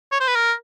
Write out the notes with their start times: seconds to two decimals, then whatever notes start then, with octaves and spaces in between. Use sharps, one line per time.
0.12 C#5
0.20 C5
0.28 B4
0.35 A#4